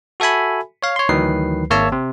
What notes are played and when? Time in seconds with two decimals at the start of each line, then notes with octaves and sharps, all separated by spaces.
0.20 F#4 A4 E5 G#5 B5
0.83 C#5 F5
0.96 C#5 C6
1.09 D2 D#3 E3 F#3 B4 C7
1.70 G#1 A#3 C#5 E5 A5 E6
1.92 C3